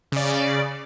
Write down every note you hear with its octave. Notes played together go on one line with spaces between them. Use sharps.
C#3 D5